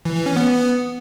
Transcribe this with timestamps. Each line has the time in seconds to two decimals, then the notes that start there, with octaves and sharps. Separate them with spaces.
0.05 E3
0.16 E3
0.26 C#4
0.36 B3